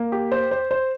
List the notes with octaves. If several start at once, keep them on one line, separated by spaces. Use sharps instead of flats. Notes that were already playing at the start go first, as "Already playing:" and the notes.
Already playing: A#3
G4
C5
C5
C5